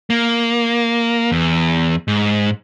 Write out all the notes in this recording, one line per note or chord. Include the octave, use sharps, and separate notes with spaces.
A#3
E2
G#2